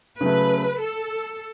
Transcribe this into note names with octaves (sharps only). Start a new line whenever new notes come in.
C#3 F#3 A3 B4
A4